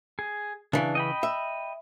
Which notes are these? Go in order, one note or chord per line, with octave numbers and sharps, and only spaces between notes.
G#4
C#3 E3 D4
D#5 G5 B5
E5